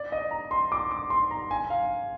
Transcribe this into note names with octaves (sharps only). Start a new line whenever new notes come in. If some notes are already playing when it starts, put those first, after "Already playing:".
Already playing: D5
D#5
A#5
C6
D6
D6
C6
A#5
G#5
F5